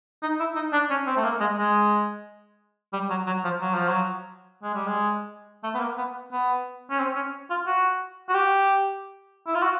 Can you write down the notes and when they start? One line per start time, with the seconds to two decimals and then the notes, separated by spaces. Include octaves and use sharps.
0.22 D#4
0.40 E4
0.56 D#4
0.72 D4
0.90 C#4
1.07 C4
1.16 A3
1.24 A#3
1.40 G#3
1.58 G#3
2.93 G3
3.10 F#3
3.27 F#3
3.44 F3
3.61 F#3
3.74 F3
3.89 F#3
4.63 G#3
4.74 G3
4.86 G#3
5.63 A3
5.74 B3
5.80 A#3
5.98 B3
6.32 B3
6.90 C#4
6.99 C4
7.16 C#4
7.50 F4
7.67 F#4
8.29 F#4
8.34 G4
9.47 E4
9.55 F4
9.63 F#4